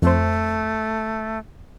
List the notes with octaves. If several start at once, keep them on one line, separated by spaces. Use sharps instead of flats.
F2 A3 C5